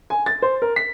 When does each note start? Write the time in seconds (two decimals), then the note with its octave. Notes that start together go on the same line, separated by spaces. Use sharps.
0.10 G#5
0.26 A6
0.42 C5
0.62 A#4
0.76 B6